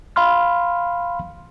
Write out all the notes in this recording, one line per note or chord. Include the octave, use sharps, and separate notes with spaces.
F5 B5 C6 F6